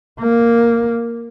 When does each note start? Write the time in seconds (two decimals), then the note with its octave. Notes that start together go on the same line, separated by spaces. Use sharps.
0.20 A#3